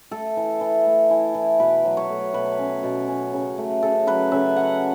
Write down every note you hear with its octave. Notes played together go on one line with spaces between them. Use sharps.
A3 A4
E3
E3
A3
E3
E3
B2 B4
F#3
C#5
A3
B2 B4
C#4
B2
C#4
C#3
A3
C#3 A4
F#3 B4
C#3 E5
C#4 F#5